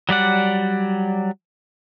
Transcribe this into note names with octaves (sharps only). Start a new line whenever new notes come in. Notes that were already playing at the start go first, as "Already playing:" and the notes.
F#3 G3 D5 F#5